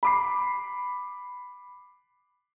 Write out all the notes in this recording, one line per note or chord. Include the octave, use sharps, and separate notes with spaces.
B5 D6 C7